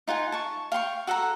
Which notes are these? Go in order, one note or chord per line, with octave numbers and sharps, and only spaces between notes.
D#4 F4 F#5 G#5
A5 C#6
F5 G5 C6 C#6
F#4 A4 F#5 A#5